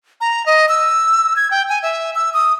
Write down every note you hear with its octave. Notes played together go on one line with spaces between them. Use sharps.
A#5
D#5
E6
G#6
G5
G#5
E5
E6
D#6